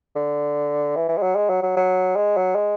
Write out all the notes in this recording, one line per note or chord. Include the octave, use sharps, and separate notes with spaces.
D3
E3
E3
G#3
F#3
G#3
F#3
F#3
F#3
G#3
F#3
G#3